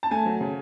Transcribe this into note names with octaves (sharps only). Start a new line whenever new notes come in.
A5
A3 G#5
F#3
C#3